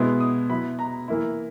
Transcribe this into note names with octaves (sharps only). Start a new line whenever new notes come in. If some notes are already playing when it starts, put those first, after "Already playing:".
Already playing: B2 G#3 B3 E4
D#6
F#3 B3 E4 B5
A#5
E3 A#3 E4